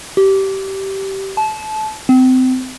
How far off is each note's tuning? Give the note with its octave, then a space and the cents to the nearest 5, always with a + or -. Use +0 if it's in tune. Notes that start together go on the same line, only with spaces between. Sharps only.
G4 -20
A5 -25
C4 -30